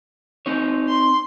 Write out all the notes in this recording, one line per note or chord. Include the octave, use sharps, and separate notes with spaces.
C4 D#4 C#5
C6